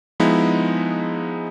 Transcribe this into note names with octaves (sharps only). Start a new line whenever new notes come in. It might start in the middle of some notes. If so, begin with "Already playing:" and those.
F3 G#3 B3 D#4 E4